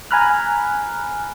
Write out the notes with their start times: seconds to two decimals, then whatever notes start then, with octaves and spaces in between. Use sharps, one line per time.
0.11 G#5 A#5 B5 F6 F#6